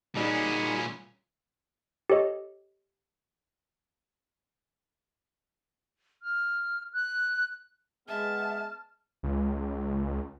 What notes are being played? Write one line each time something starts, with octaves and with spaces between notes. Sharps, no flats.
A#2 G3 C#4 D#4 F#4 G#4 D5 B5
G4 A4 C#5 D#5
F6
F#6
G#3 B3 E5 A5 F6
C#2